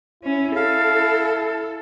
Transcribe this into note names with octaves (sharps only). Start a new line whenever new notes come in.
C#4 E4
A4 F5